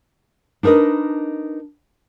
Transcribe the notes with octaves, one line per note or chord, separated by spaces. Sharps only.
D4 D#4 A#4 B4 D#5